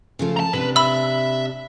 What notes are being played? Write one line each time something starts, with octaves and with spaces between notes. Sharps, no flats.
C#3 F3 A3
A5 A#5
C3 D4 B4
E5 B5 E6